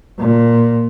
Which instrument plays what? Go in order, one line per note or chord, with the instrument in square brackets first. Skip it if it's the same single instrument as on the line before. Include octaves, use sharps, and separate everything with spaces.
[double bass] A#2